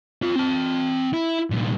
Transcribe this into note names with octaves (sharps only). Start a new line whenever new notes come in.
F4 A4
C4 A5
E4
C2 A#2